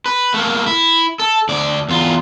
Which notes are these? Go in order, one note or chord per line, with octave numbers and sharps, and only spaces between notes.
B4
A3 A#3
E4
A4
D2 D5
E2 F4